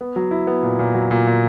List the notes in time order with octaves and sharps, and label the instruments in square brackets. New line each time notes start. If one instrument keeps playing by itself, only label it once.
[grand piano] B3
F#3
E4
B3
A#2
A#2
F#3
A#2
A#2